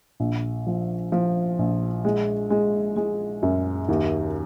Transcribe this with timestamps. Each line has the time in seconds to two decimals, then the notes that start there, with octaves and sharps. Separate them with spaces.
0.20 A#1
0.67 F3
1.12 F3
1.59 A#1
2.05 G#3
2.50 G#3
2.96 G#3
3.43 F#2
3.89 D#2